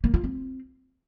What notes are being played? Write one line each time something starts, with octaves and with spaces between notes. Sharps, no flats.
A#3
F4
C4